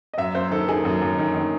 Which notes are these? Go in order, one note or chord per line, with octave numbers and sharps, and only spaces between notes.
D#5
F#2 E5
F#2 C5
D#3 A4
D#3 G#4
F#2
F#2
D#3
D#3